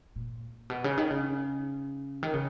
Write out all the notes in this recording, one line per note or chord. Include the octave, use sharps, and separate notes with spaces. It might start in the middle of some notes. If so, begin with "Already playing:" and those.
A#2
B2
C#3
D#3
C#3
D#3
C#3